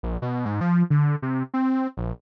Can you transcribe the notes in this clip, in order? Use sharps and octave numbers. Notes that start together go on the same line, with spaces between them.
A#1
B2
G#2
F3
D3
C3
C4
A#1